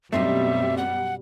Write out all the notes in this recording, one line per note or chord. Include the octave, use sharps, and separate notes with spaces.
F#2 B2 G3 A3 C4 D#4 E5
F#5